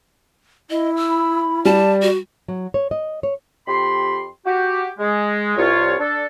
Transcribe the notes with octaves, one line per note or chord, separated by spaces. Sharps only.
E4 D#5
E6
B5
G3 D5 A5
F#4
F#3
C#5
D#5
C#5
F2 G4 B5 C6
F#4 G4
G#3
C2 F4 C#5
D4 A4